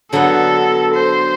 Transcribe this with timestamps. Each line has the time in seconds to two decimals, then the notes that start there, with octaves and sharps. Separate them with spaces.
0.12 D3 F#3 B3 A4
0.94 C5